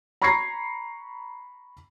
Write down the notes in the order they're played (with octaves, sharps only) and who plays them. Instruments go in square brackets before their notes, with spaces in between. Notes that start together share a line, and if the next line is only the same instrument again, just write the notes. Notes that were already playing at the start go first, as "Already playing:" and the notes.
[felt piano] A#5 B5 C#6 G#6 A#6 C7